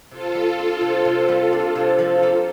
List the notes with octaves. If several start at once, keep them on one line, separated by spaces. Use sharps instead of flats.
C3 F4 A4
G3
D4 F4 A4
C3
C3
G3
D4
C3
F3 F4 A4
A#3